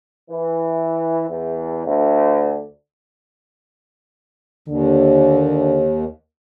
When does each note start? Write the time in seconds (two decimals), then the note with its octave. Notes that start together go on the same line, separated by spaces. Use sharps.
0.30 E3
1.29 E2
1.87 D2
4.68 D#2 D3